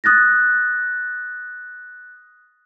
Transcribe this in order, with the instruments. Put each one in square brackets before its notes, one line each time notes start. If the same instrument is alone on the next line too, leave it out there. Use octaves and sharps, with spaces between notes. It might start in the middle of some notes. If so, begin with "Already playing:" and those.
[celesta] D#6 F#6 A6 A#6